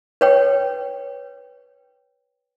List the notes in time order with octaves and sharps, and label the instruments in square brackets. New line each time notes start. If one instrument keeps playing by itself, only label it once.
[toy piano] B4 C#5 G5